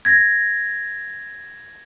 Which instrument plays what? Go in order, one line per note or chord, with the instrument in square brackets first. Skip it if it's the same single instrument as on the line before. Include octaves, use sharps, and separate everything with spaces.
[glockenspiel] G#6 A#6